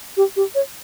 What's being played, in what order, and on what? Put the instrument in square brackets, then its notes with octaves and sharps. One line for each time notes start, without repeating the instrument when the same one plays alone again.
[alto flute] G4
G4
C#5